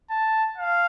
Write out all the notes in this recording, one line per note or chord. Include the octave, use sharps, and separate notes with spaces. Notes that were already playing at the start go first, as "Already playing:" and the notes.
A5
F5